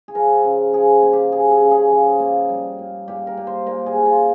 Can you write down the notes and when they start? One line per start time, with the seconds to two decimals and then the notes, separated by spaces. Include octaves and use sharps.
0.08 G#4
0.15 F3 A#4
0.44 C#3
0.73 F3 G#4
1.02 A#3
1.13 G4
1.32 A#3 G#4
1.51 G#4
1.61 C#3
1.71 G#4
1.91 F3
2.19 A#3
2.49 G3
2.79 A#2
3.08 A#2 G4
3.27 A#4
3.37 A#2
3.47 C5
3.67 A#2 A#4
3.86 G#4
3.95 A#2
4.06 F4